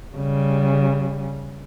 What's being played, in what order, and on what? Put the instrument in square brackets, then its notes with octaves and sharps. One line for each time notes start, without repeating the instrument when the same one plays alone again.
[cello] C#3 G3